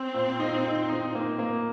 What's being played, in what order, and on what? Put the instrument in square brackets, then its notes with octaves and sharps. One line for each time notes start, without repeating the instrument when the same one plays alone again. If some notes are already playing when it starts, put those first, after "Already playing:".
Already playing: [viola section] C4
[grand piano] A#2
D#4
D#4
D#4
A#3
A#3